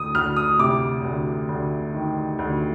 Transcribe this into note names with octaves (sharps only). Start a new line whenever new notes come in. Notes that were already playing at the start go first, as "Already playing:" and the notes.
Already playing: D2 D#6
D2 F6
D#6
C3 D6
D2
D2
D#3
D2